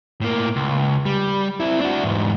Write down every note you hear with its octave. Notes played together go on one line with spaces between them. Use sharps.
A2 A#3
C#2
G3
C4 E4
D4 F#4
E2 G#2